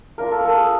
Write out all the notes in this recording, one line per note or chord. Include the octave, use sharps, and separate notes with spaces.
A#3 D4 F4 A#4
A4
A#4
A4
G#4